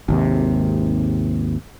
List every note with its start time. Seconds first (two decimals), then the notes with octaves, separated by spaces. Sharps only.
0.08 G#1 D#2 C3